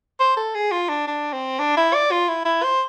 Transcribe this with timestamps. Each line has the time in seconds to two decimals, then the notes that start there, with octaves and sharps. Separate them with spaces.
0.20 C5
0.37 A4
0.55 G#4
0.72 F4
0.89 D4
1.07 D4
1.33 C4
1.59 D4
1.77 E4
1.94 D5
2.11 F4
2.29 E4
2.45 E4
2.63 C5